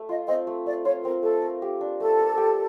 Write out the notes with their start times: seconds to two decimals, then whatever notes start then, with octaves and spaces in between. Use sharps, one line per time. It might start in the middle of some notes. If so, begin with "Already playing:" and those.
Already playing: A3
0.09 F4 D#5
0.28 C4 D#5
0.47 A3
0.66 A3 D5
0.85 F4 C#5
1.04 C4 A#4
1.23 A3 A4
1.42 A#4
1.62 G4
1.81 D4
2.00 A3 A4
2.19 A#4
2.37 G4